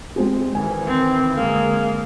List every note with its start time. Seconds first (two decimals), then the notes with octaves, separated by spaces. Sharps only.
0.16 G#3 C4 G#4
0.53 D#3 E3 C5 G#5
0.87 C4
1.36 D3 G#3 A#3